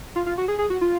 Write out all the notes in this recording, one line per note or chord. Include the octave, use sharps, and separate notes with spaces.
F4
F4
F#4
G#4
G#4
F#4
F4